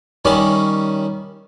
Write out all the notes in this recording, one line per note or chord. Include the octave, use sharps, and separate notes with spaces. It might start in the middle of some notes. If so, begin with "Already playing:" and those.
D#3 G3 C#4 D6